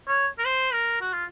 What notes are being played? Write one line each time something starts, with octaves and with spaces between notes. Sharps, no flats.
C#5
A#4
C5
A#4
F#4
F4